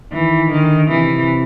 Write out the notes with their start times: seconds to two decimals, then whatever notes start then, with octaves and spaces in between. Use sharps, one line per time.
0.12 D#3 E3
0.50 D3 D#3
0.88 C3 E3